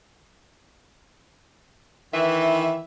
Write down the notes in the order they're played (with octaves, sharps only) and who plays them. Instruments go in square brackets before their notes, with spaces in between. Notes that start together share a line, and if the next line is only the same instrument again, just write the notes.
[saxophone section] D#3 E3 [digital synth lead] E5